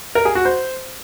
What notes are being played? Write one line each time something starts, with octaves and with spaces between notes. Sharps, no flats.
A#4
G#4
F#4
C5